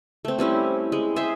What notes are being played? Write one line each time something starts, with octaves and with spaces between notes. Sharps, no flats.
A3 C4
G3 C4 C#4 E4
G#3
G#4 C5 E5